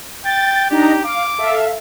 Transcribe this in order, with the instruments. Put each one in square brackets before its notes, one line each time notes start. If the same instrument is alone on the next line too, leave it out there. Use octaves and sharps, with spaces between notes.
[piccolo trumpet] G5 [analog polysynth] A6
[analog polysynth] D4 D#4 A#5 [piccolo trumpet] G4
[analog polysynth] F5 [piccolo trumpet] D6
[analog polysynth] A4 E5 F5